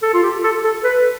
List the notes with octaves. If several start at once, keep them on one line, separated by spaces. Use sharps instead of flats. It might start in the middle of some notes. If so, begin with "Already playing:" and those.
A4
F4
G4
A4
A4
B4